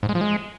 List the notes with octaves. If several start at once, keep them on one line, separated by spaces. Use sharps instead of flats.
G#2
G#3
F3
G#3